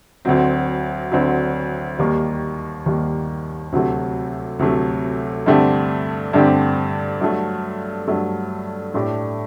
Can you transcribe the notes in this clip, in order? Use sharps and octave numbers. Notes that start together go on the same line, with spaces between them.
D2 D3 F#3 C4
D2 D3 F#3 C4
D#2 D#3 G3 A#3
D#2 D#3 G3 A#3
D2 C3 F#3 A3
D2 C3 F#3 A3
G2 D3 A3 C4 G4
G2 D3 A3 C4 G4
G2 F#3 A3
G2 F#3 A3
A2 A3 D4 G4